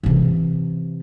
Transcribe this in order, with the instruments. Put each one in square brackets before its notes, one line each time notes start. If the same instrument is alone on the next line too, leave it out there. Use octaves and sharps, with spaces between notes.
[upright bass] C3 E3